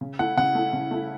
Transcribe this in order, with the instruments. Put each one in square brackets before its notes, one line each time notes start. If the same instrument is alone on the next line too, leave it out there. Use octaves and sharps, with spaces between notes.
[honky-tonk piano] C#3
[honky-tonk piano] A3 E4 [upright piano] F#5
[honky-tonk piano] C#3 [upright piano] F#5
[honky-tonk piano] A3 E4
C#3
A3 E4